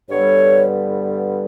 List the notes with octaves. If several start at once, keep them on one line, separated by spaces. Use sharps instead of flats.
G2 D3 G3 B3 A4 C#5